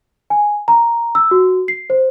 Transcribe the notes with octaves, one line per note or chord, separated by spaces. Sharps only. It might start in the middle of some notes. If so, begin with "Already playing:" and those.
G#5
A#5
E6
F#4
C7
C5